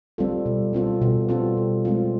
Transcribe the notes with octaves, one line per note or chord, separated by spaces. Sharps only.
G3 C4 F4 A4
B2
G3 C4 F4 A4
B2
G3 C4 F4 A4
B2
G#3 C4 F4